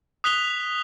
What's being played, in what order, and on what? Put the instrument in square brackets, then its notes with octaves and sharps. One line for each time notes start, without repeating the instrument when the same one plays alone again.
[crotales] D#6 F#6 B6 F7 G7